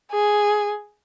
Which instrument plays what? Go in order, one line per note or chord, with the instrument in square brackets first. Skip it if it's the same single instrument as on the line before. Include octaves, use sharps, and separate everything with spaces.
[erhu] G#4